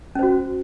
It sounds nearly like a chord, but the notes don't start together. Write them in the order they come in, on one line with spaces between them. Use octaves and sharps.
C#4 C5 F#4